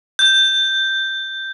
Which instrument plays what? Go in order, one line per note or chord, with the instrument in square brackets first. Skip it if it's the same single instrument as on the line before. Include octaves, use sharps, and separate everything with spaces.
[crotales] G6